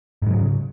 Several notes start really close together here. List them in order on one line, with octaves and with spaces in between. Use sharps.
G#2 F#3 C#3